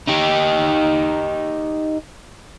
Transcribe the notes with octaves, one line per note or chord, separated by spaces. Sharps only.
D#4 G4